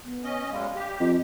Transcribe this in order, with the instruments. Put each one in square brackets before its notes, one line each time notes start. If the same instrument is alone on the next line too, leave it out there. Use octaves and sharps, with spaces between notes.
[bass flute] B3
[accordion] C#4 D#5
[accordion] F#2 G3 G#3 [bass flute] F5
[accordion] G4
[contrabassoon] F2 [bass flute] D#5